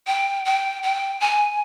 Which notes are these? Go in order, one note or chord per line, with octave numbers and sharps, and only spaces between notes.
G5
G5
G5
G#5